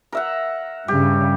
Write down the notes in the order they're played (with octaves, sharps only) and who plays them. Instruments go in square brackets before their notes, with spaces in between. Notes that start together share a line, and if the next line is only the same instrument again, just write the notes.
[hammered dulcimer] A#4 E5 F#5
[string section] G2 C#3 [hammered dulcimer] G4